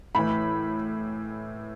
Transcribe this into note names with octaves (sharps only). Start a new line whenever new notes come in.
A2 E3 B5